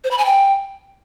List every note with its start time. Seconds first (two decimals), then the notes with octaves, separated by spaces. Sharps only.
0.04 C5
0.11 B5
0.18 G#5
0.25 G5